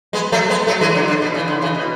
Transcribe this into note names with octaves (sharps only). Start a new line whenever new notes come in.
G#3 B3
F#3 A3
G#3 B3
F#3 A3
E3 G#3
D3 F#3
D3
B2
C#3 E3
D3
C#3 E3
B2